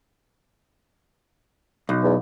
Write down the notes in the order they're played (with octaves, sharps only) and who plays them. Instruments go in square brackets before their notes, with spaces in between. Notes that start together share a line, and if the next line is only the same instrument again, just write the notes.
[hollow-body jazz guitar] B1
[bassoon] E2